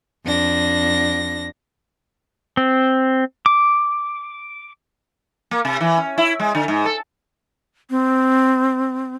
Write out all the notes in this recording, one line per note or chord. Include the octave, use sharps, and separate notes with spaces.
F2 D4 A#6
C4
D6
A#3
C3
E3
C#4
E4
G#3
D3
G#2
A4
C4